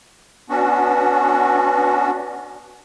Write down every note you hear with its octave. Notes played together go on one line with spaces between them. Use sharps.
B3 C#4 D4 F#4